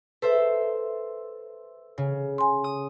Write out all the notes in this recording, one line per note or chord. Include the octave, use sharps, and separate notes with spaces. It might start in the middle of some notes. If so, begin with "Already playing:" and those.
A4 B4 C5 E5
C#3
G#5 C6
D#6